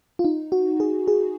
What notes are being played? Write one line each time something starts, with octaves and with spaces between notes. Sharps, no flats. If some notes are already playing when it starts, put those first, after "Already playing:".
F4
D#4
F#4
G#4
G#4